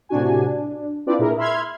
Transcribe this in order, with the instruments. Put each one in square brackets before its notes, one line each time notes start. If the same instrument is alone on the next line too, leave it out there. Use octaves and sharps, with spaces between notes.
[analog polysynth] A2 C3 D4 F#4 G#5
D4
C4 D4 E4 F4 B4 D5
A#2 E4 G#4 A#4
E5 B5 C6 F6 G#6